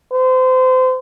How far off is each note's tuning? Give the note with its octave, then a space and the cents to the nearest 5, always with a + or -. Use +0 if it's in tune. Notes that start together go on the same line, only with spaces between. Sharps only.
C5 -30